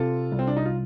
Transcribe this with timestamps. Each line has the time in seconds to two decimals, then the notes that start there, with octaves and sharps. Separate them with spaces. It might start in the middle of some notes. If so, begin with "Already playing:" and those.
Already playing: C3 F4 A4
0.32 C2
0.39 C4
0.47 D4
0.57 D#4
0.66 F4